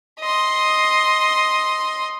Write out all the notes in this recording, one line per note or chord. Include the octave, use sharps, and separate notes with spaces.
D#5 C6